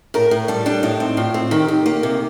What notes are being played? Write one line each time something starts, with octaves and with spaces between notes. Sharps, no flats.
A2 A#4
A2
G3 A4
G3 D4
A2 D#4
C4
A2 F4
C4
D#3 G4
D#3
A#3
C3